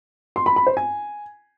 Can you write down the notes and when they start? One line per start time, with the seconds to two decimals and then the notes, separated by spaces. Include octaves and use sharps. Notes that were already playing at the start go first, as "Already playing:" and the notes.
0.36 C6
0.46 B5
0.56 B5
0.67 C5
0.77 G#5